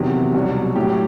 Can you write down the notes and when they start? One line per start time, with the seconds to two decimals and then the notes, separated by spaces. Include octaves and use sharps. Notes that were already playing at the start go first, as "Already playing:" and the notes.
Already playing: E2 C3 D#3 F#3
0.33 C2 B2 F#3 F#4
0.75 A2 F#3 G4